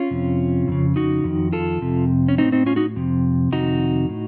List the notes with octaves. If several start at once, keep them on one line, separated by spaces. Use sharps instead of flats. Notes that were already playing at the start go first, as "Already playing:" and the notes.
Already playing: C#4 F4
F2 C3
F2 C#3
D#4 F#4
F2 D#3
F4 A4
F2 C3
C#4
A2 C4 D#4
C4 D#4
C#4 F4
D#4 F#4
F2 C3
F2 C3 D#3 D#4 F#4
A2